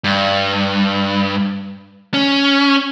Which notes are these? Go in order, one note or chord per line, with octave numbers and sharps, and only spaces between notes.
G2
C#4